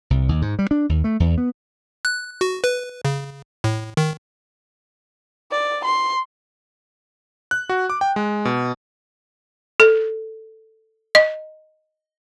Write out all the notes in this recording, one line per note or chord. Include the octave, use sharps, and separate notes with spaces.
C2
D#2
G#2
G3
D4
D#2
A3
E2
B3
F#6
F#4
B4
C#3
A2
D#3
D5
C6
F#6
F#4
D6
G5
G#3
B2
A4
D#5